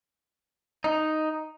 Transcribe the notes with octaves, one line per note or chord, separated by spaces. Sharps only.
D#4